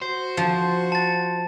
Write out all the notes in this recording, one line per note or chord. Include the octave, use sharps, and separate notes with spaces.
F#4 C5
F3
A5 A6